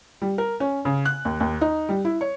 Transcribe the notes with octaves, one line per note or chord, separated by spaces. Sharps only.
G3
A#4
C#4
C#3
F#6
D#2
D#2
D#4
G3
E4
C#5